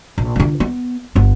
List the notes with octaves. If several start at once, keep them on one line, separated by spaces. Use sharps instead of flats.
A#1
D3 F4
B3
G1 B3